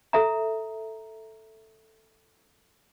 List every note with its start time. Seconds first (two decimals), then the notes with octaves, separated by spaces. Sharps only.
0.13 A4 E5 A#5